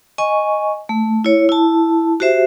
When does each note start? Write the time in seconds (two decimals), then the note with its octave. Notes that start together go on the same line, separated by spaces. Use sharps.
0.18 D#5 G#5 C#6
0.89 A3
1.24 E4 C#5
1.49 E4 A5
2.20 F#4 G4 C5 E5